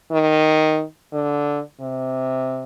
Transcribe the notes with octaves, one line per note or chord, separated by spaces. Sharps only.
D#3
D3
C3